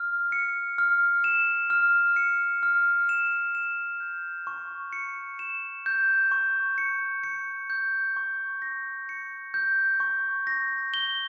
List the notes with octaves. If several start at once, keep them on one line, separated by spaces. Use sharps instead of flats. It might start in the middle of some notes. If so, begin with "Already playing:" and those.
Already playing: F6
C#7
F6
E7
F6
C#7
F6
E7
E7
G6
C#6
C#7
E7
G6
C#6
C#7
C#7
G6
C#6
A#6
C#7
G6
C#6
A#6
G7